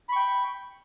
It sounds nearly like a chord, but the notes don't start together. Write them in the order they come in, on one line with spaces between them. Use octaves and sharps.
B5 C#6 G5